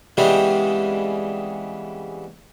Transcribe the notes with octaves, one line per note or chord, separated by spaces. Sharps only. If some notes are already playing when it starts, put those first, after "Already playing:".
C#3 E3 G3 G#3 B3 C4